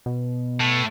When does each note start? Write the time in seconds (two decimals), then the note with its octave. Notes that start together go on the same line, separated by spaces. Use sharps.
0.06 B2
0.60 A2